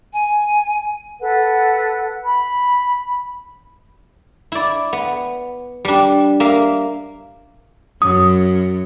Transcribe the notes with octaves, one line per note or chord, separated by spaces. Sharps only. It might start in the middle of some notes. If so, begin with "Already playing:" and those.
G#5
A4 B4 F#5
B5
E4 D5
B3
G3 D4
A#3 E5
F#2 D#6